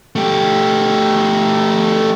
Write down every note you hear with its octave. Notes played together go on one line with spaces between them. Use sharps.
A3 G4